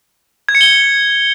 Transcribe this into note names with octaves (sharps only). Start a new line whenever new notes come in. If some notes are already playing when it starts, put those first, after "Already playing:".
G#6
C#7
G7